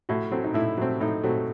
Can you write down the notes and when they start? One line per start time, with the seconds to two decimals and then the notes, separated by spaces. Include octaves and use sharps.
0.09 A2 F#4
0.31 F#3 A3 C4
0.44 D#4
0.54 A2 E4
0.77 F#3 A3 C4
1.00 A2 D#4
1.23 F#3 A3 C4